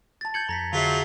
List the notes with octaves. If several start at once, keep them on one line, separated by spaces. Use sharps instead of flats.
A5 A6
G6 G#6 C#7 F#7
F2 A#5 A#6 B6
D3 F#3 F4 G#4 E5 B6 C7 F7